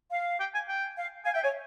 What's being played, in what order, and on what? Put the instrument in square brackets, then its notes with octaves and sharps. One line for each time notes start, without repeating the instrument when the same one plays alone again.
[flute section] F5
[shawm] G5
G#5
G5
[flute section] F5
[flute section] F5 [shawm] G#5
[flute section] E5 [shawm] G5
[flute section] C#5 [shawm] G#5